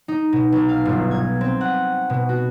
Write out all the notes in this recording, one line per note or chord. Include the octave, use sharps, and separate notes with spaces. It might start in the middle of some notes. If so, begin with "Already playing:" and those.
D#4
B2
B1
F5
G1
G#6
C4
F#5
B2
F#4